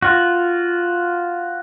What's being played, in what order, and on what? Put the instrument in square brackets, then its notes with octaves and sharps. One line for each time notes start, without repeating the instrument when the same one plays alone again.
[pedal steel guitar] F4 F#4